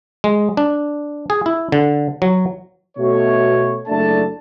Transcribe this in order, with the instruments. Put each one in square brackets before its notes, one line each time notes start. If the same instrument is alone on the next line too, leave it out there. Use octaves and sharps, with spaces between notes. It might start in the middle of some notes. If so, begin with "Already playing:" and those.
[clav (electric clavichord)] G#3
D4
G#4
E4
D3
F#3
[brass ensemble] B2 A3 C#5
F#1 A3 D4 A5